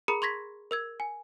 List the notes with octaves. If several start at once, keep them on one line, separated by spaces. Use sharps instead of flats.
G#4 A#4 A#5 B5 D#6 C#7
C6 C#6 G#6 A#6 B6
A#4 E6 G#6
G#5